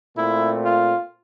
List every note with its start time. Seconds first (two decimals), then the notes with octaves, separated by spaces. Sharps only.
0.17 A#2 A3 C4 E4
0.64 F4